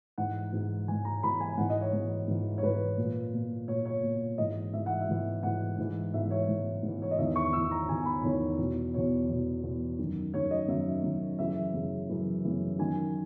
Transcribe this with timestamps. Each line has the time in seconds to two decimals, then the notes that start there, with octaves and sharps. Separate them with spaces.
0.18 G#2 E3 F#5
0.53 G#2 E3
0.88 G#2 E3 G#5
1.05 A#5
1.23 G#2 E3 B5
1.40 G#5
1.57 G#2 E3 F#5
1.70 D#5
1.81 C#5
1.93 G#2 E3
2.28 G#2 E3
2.58 C#5
2.63 G#2 E3 B4
2.97 A#2
3.34 A#2
3.68 A#2 C#5
3.85 C#5
4.03 A#2
4.38 G#2 E3 D#5
4.73 G#2 E3 E5
4.86 F#5
5.01 E5
5.08 G#2 E3
5.43 G#2 E3 F#5
5.78 G#2 E3
6.14 G#2 E3 E5
6.31 C#5
6.48 G#2 E3
6.83 G#2
6.88 E3
7.02 C#5
7.11 D#5
7.18 E2 D#3 E5
7.36 C#6
7.53 E2 D#3 E6
7.71 A#5
7.88 E2 D#3 G#5
8.05 B5
8.24 E2 D#3 C#5
8.59 E2 B2
8.94 E2 B2 C#5
9.29 E2 B2
9.63 E2 B2
9.99 F#2 D#3
10.34 F#2 D#3 C#5
10.51 D#5
10.68 F#2 D#3 E5
11.03 F#2 D#3
11.39 F#2 C#3 E3 E5
11.74 F#2 C#3 E3
12.09 F#2 C#3 E3
12.45 F#2 C#3 E3
12.79 F#2 D#3 G#5